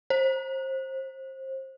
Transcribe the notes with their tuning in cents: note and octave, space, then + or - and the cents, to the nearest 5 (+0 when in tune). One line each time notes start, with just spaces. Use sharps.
C5 +25